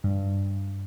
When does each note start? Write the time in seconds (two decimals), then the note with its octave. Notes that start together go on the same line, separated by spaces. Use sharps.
0.04 G2